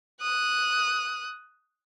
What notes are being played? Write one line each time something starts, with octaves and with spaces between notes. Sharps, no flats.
D#6 F#6